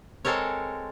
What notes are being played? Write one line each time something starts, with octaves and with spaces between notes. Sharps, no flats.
G#3 C4 A4 A#4 C#5